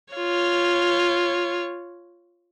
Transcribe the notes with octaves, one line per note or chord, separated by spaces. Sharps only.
F4 C#5